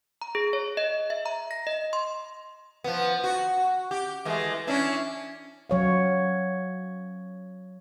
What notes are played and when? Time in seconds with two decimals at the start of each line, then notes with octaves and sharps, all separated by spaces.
0.22 A#5
0.35 G#4
0.53 C#5
0.77 D#5
1.10 E5
1.26 A#5
1.51 A#6
1.67 D#5
1.93 C6
2.84 F3 B3
3.24 F#4
3.91 G4
4.25 E3 G#3 A3
4.67 C#4 D4 E4
5.70 F#3 C#5 F5